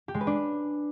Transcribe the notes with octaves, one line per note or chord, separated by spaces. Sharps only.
G4
G#3
B4
D4